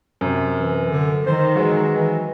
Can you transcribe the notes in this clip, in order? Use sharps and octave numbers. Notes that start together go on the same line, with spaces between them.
F#2 C3
E3
D3
D#3 C5
E3 F#3 G#3
E3